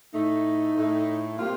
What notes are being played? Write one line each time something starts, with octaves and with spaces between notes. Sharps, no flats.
A2 A3 D#4
A2 A3
C3 G3 A#3 F4